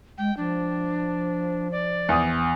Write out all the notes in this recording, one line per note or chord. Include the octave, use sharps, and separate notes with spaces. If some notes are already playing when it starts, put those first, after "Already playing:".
G#3 G5
F3 D4
D5
E2 D#6